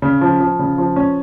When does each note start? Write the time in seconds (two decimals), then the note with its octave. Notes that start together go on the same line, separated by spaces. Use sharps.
0.02 C#3
0.21 F3
0.40 F3
0.59 C#3
0.78 F3
0.96 C#4